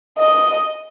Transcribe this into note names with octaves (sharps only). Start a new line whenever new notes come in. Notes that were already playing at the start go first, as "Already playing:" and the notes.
D#5